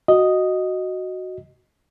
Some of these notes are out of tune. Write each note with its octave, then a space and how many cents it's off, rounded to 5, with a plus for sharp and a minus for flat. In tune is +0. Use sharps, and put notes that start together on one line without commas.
F#4 +0 D#5 +0